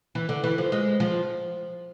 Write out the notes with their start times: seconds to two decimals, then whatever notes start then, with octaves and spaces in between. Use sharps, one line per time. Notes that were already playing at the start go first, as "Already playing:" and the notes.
0.15 E3
0.29 D3
0.44 E3
0.58 F3
0.72 G#3
1.00 F3